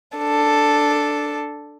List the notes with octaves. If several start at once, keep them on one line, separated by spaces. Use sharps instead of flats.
D4 A4